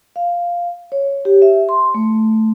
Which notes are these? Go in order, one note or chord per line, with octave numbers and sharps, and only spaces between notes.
F5
C#5
G4
E5
C6
A3